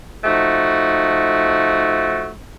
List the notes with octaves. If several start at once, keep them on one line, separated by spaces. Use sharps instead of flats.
F3 A3 D#4 F#4